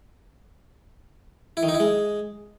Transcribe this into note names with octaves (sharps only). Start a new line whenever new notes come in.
E4
D#3
D#4
E4
G#3